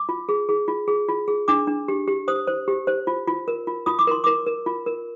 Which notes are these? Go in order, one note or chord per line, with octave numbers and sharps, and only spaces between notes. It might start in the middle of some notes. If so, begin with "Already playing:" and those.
Already playing: D6
F4
G#4
G#4
F4
G#4
F4
G#4
D4 D6
D4
G4
G4
C5 D#6
C5
G4
C5
F4
F4
A#4
F4
F4 D#6
D6
A#4 C6
A#4 D6
A#4
F4
A#4